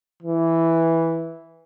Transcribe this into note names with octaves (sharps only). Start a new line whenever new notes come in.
E3